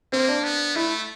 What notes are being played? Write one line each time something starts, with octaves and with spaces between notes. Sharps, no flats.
A#3 C4
D4
B3
A3 E4